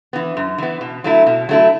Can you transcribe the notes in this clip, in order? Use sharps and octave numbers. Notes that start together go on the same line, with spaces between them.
E3 B3
F#2
E3 B3
B2
F#3 A3 E4
B2
F#3 A3 E4